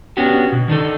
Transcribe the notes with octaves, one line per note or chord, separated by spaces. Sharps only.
B3 C#4 D4 F#4 G4
B2
D#3 D4 D#4 A4